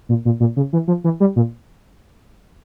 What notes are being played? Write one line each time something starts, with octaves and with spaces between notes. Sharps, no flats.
A#2
A#2
A#2
C#3
E3
F3
E3
G3
A#2